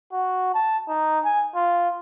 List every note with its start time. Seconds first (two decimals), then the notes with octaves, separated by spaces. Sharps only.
0.12 F#4
0.54 A5
0.88 D#4
1.25 G#5
1.55 F4